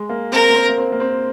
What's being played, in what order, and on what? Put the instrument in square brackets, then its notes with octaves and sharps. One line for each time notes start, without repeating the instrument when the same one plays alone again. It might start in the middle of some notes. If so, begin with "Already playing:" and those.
Already playing: [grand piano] G#3
A#3
[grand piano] C4 [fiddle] A#4
[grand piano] A#3
C4
A#3
C4
A#3
C4